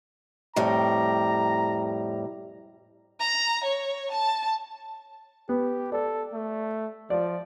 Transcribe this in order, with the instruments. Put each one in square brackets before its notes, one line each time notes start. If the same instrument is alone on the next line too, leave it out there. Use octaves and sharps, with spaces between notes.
[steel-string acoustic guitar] F2 A2 G3 [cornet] A#5
[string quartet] A#5
C#5
A5
[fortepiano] B3 [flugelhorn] G4
[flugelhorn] A4 [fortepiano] D5
[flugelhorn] A3
[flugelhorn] F3 [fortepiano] D5